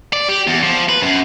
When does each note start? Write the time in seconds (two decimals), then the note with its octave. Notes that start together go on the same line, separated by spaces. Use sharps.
0.13 D5
0.29 G4
0.48 E2
0.63 F3
0.89 B4
1.02 F#2